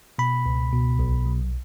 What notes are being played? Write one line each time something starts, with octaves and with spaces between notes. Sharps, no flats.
B2 B5
C#2
B2
B1
F#3